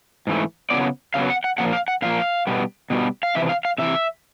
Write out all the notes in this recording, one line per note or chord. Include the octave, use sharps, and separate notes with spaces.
G#2 E3 A3
C#3 F#3 B3 D5
C#3 F#3 B3 F5
F#5
F#5
A#2 F3 A#3 F#5
F5
F#5
A#2 F3 A#3 F5
B2 G3 B3
B2 G3 B3
F5
C3 E3 E5
F5
F5
C3 E3 E5